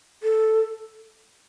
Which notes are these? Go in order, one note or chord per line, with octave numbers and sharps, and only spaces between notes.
A4